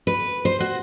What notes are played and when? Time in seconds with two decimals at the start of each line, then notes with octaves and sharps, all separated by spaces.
0.07 B4
0.45 C5
0.60 F#4